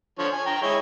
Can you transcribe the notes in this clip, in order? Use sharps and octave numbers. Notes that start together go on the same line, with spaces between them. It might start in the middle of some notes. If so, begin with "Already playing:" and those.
D3 F3 C#5
G#5
G5 A#5
G#3 E4 C#5